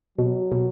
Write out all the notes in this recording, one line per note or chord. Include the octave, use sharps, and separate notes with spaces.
B2 F#3
B2